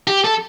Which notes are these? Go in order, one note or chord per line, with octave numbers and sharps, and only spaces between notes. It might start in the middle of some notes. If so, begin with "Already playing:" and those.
G4
A4